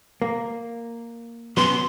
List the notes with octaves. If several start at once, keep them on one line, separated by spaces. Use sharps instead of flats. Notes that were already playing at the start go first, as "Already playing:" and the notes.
A#3
F#3 B3 C#4 C6